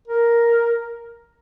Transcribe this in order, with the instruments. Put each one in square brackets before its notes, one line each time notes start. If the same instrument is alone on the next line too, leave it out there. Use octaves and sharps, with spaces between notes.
[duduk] A#4